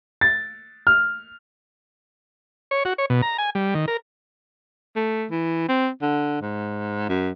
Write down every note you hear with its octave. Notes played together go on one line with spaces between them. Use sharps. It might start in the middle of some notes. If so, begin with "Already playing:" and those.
A6
F6
C#5
F#4
C#5
B2
A#5
G#5
G3
D#3
A#4
A3
E3
C4
D3
G#2
F#2